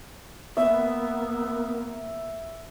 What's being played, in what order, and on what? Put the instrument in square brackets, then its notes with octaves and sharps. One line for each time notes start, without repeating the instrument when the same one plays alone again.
[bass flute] A#3 [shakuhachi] B3 [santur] E5